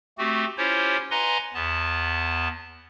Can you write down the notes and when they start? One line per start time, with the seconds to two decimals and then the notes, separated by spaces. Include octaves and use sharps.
0.18 A3 C4 F#4 G4
0.58 C#4 E4 F4 G4 C5 C#5
1.11 B4 D#5 F#5 G#5 A#5 C6
1.54 E2 B3 A5